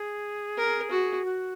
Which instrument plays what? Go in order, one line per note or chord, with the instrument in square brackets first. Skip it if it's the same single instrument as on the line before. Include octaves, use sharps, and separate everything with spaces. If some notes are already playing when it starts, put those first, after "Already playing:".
Already playing: [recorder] G#4
[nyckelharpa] A#4
F#4
[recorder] F#4